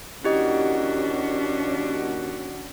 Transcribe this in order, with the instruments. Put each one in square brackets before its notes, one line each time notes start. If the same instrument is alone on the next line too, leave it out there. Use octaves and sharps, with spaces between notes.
[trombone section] D#2 F#4 [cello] C#4 D4 [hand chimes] E4 G4 D#5